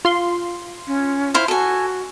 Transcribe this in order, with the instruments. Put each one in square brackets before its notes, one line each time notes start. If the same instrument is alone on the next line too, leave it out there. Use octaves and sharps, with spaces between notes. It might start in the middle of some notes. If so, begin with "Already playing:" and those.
[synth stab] F4 C6
[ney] C#4
[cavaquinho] E4 C5 F5
[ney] F#4 [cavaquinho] A4 G#5